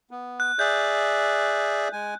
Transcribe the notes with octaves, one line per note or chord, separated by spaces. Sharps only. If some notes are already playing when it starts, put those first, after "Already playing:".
B3
F#6
G#4 D5 E5 G6
G#3 G#5